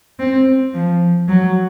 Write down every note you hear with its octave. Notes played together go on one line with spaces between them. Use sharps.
C4
F3
F#3